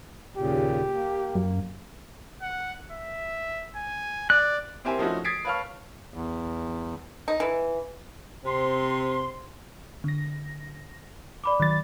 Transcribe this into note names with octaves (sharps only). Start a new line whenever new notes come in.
D#2 A#2 C#3 G4
A#3
F#2
F#5
E5
G#5
D5 F#6
C4 E4 G4 A#4 C5 G#5
F3 A3 C#4 D#4 E4 F#4
D#6 G#6 A6 B6 C7 D7
B4 C#5 F5 A5 C#6 F6
E2
D#4
E3
C3 C4 C6
D3 A#6
D5 B5 D6
D#3 F#3 A6